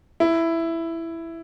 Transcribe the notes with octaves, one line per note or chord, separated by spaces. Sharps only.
E4